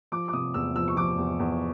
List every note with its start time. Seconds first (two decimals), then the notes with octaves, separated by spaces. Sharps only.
0.12 F3 D6
0.28 D6
0.33 C3 D#6
0.54 E2 E6
0.76 F3 E6
0.88 C#6
0.97 F3 D6
1.18 E2
1.39 E2